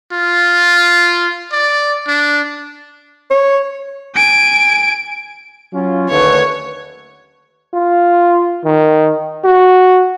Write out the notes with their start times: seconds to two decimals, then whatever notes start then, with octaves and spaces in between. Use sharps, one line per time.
0.12 F4
1.52 D5
2.07 D4
3.30 C#5
4.15 G#5 D7
5.73 F#3 C#4 F4
6.10 D#2 D3 A3 B4 C#5
7.74 F4
8.65 D#3
9.45 F#4